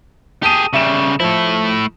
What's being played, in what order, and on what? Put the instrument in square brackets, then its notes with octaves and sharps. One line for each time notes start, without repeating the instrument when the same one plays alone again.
[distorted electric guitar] G4 G#4 [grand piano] A5 D#6 D#7
[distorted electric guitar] C#3 G3 [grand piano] E5 E7
[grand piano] F3 [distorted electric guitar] A3 E4